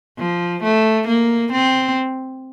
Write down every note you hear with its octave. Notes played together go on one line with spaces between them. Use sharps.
F3
A3
A#3
C4